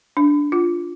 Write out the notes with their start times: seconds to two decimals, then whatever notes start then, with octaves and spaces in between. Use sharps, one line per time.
0.17 D4
0.52 F4